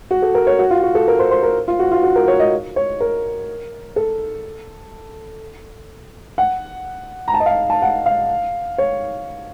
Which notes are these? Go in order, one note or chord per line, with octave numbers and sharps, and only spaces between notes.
F#4
A4
A#4
C#5
F#4
F4
F#4
A4
A#4
C5
C5
A#4
F4
F#4
F4
F#4
A#4
C#5
D#5
C#5
A#4
A4
F#5
A#5
A5
D#5
F5
A5
F#5
F5
C#5